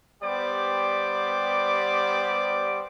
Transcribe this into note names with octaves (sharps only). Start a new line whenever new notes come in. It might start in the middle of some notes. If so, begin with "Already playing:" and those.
G3 B3 G4 C5 D5 D6